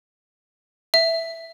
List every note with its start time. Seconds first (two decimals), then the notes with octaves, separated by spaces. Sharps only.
0.94 E5